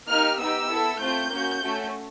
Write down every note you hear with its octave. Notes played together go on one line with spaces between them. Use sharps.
A#3 D#4 G4 F6
B3 D#4 G4 E6
B3 E4 A4
A3 C4 F4 G6
A#3 C#4 F#4
A3 C#4 F#4 A4